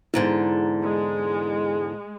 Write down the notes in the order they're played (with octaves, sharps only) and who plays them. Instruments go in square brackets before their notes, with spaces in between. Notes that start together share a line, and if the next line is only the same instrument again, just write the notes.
[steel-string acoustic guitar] E2 G#2 D3 [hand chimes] E4
[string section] G#3